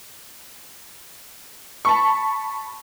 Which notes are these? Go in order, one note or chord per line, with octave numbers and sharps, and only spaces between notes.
A5 B5 C#6